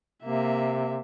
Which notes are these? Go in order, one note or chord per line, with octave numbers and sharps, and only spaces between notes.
C3 A#3 E5